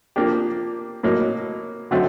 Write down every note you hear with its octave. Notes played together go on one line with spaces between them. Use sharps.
F3 A#3 D4 G4
A2 F#3 A#3 D#4
D3 F#3 A3 C4 D#4